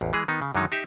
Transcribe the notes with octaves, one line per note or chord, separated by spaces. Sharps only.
A1 E2
E3 G#3 G#4
D#3 B3 D#4
C#3
F#2 D3 D#3 F#3 G#3 D#4
D#4 G4 E5